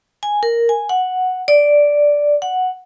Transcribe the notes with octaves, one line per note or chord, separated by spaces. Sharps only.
G#5
A#4
G#5
F#5
D5
F#5